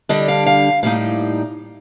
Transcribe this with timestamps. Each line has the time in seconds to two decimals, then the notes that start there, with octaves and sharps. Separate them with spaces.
0.09 D3 G3 D4 D#5
0.28 F5
0.46 F5
0.83 A2 G3 A#3 D#4 F5